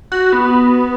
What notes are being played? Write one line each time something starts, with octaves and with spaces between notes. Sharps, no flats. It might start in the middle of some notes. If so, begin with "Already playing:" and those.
F#4
B3